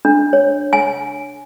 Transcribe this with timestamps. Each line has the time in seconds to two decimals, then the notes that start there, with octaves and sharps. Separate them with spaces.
0.05 D4
0.33 C#5
0.73 G#5